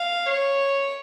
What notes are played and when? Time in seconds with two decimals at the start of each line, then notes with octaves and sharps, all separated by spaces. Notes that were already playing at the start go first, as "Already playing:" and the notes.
Already playing: F5
0.26 C#5